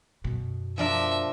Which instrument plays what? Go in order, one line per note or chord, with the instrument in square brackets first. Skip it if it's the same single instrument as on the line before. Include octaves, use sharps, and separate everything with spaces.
[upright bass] F#2 B2
[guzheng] F3 D4 A#4 [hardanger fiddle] E5